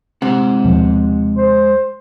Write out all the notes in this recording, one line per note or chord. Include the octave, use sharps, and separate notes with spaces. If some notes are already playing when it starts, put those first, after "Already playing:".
C3 G#3 F#5
D#2 B2 F3
C5